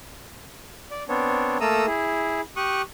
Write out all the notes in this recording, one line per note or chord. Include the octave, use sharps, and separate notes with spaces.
D5
B3 C4 D4 C#5
A3 A#3 A4 A#5 D#6 E6
E4 G#4
G4 C#6 D#6 F#6